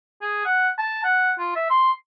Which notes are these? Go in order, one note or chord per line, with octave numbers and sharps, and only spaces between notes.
G#4
F#5
A5
F#5
F4
E5
C6